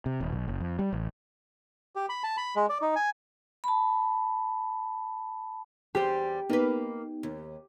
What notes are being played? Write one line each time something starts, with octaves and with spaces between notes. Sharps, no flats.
C3
D#1
B1
F#1
F2
G3
A1
G4
B5
A5
B5
G#3
D5
D#4
G#5
A5 B5
E2 G3 G4 C5
A#3 B3 D#4 B4
D#2